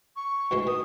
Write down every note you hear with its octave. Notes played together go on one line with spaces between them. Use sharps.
C#6
D2 E3 G#3
D#3 D#6